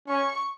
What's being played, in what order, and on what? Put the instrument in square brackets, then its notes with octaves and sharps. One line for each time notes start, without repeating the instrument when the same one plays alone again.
[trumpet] C#4 [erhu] C#6